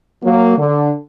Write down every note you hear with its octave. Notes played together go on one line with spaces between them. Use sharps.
F#3 A#3
D3